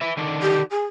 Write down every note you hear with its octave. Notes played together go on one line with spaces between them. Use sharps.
B4 E5
D3 D#3 D4
G4
G#4